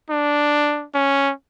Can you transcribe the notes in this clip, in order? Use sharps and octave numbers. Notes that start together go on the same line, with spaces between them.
D4
C#4